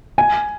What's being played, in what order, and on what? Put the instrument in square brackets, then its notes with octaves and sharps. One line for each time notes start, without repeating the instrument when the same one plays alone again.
[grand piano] G#5